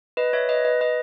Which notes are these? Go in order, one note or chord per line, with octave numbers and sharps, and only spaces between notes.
B4 D#5
C#5 E5
B4 D#5
B4 D#5
B4 D#5